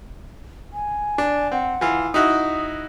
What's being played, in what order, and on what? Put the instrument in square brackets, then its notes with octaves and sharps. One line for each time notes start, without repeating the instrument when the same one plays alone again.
[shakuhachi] G#5
[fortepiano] D4
[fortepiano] C4 [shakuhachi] F#5
[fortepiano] E3 F4
[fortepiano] D#4 E4 F#4 [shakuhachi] D#6